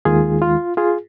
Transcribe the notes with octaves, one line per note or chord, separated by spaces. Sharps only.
D#2 D#3 G#3 F4 G#4
F4
F4 G#4